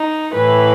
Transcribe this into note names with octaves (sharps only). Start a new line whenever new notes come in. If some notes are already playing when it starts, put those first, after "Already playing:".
Already playing: D#4
A2 E3 B4